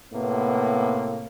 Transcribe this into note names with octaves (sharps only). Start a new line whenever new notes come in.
A2 C3 A#3 B3